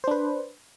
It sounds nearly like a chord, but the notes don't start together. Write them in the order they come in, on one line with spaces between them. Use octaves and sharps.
C5 D4 B4